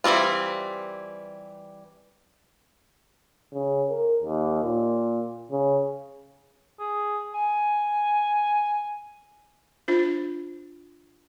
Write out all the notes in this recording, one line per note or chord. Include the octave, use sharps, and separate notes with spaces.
E3 F3 G3 C4 F4
C#3
A#4
D#2
A#2
C#3
G#4
G#5
D4 F4 C5